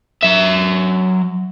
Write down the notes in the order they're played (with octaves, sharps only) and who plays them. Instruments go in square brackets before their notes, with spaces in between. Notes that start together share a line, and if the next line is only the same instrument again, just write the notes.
[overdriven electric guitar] F#3 E5